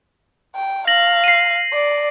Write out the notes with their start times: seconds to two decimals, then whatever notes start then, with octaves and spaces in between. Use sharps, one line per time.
0.56 G5
0.87 F5 A#6 F#7
1.24 C7 D#7
1.73 D5